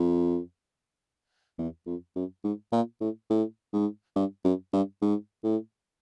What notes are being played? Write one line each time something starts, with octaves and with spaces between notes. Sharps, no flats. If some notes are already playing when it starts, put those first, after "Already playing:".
Already playing: F2
E2
F2
F#2
G#2
A#2
A2
A2
G#2
G2
F#2
G2
G#2
A2